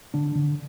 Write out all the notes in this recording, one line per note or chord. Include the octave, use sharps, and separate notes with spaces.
D3 D4
D3